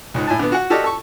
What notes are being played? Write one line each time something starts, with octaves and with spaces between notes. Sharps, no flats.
C#2 G#2
A2 G#5 A5
D3 B3
F#4 F#5
F#4 G4 A4 D5 D#5 F6
A4 C#6